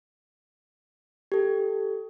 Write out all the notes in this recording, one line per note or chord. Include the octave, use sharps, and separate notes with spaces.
G4 A4